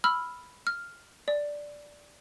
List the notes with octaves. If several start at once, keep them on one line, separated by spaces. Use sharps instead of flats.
B5 E6 F6
F6
D5